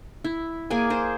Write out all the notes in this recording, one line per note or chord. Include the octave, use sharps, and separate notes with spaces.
E4
A#3 G#4 D5 G#5
G#4 C5